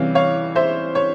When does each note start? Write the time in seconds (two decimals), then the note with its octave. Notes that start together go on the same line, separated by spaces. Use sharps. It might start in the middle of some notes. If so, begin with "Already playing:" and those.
Already playing: C3 E3 G3 C#4 F5
0.15 C#5 F5
0.55 C5 E5
0.95 C#5